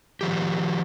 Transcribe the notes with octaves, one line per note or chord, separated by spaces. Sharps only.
D#3 F3 G4